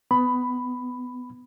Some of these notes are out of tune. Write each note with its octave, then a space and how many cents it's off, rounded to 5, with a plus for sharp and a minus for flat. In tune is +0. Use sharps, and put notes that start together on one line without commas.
B3 +20 B5 +10